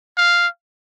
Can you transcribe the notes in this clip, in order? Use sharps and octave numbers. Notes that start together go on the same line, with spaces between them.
F5